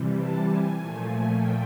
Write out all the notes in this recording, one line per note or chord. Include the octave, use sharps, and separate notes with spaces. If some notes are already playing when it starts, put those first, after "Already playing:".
Already playing: C3 E3 G3
A5
G#5
A#2 F3 A3
G#5
G5